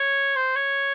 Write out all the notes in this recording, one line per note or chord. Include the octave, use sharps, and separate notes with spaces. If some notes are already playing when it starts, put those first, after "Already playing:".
Already playing: C#5
C5
C#5